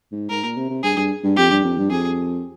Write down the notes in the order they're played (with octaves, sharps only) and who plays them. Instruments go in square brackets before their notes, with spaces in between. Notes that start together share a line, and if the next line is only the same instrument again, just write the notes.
[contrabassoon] G#2
[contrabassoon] G#2 [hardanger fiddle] A#4
[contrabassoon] A#2
C3
C3
[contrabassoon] G2 [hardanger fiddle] G#4
[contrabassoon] G2
G2
[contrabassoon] F2 [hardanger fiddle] G4
[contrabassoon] G2
F2
G2
[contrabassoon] F2 [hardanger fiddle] G#4